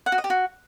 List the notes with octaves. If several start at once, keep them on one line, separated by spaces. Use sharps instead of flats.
F#5
F#4
D#5
G4
F#4